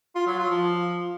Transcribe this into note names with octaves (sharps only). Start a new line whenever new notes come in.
F4
F#3
F4
F3